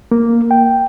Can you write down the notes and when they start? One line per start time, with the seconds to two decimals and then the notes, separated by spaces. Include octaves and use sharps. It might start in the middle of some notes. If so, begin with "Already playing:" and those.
0.11 A#3
0.51 G5